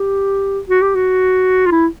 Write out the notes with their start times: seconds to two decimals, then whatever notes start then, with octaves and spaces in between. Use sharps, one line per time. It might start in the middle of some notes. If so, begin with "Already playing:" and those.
Already playing: G4
0.69 F#4
0.82 G4
0.95 F#4
1.66 F4
1.71 E4